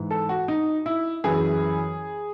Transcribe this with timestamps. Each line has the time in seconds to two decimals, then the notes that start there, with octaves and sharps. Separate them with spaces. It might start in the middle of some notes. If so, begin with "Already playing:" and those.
Already playing: G#2 E3
0.11 A4
0.29 F#4
0.48 D#4
0.86 E4
1.24 F#2 E3 G#4